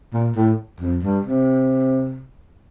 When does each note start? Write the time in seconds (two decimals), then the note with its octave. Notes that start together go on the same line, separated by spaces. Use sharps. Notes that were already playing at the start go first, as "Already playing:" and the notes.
0.13 A#2
0.36 A2
0.80 F2
1.03 G2
1.25 C3